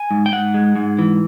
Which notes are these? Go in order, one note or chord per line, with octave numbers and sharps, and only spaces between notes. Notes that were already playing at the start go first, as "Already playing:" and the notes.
Already playing: G#5
G#2
G5
G#2 F#5
G#3
G#2
E3